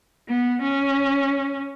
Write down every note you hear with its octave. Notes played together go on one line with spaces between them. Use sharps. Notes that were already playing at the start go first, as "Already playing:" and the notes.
B3
C#4